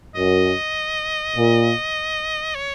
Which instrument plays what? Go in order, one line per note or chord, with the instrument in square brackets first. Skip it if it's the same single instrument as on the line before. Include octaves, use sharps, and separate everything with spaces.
[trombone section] F#2 [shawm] D#5
[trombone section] A#2
[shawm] C#5